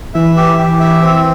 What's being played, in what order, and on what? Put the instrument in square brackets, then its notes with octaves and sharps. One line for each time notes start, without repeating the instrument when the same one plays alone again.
[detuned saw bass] E3 [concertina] E5
[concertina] G4
G4
E5
C4